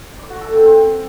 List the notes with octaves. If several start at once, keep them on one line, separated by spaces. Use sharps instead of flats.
D5
F#4
A4
C4
C4